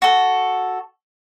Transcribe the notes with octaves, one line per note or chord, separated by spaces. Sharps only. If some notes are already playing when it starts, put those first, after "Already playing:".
F#4 A4